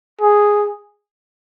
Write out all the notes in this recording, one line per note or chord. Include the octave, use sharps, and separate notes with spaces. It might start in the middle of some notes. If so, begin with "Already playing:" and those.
G#4